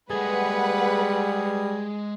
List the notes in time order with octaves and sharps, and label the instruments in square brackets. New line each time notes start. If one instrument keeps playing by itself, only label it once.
[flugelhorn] G3 [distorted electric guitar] G#3 A4 [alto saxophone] G#4 [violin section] B4 F#5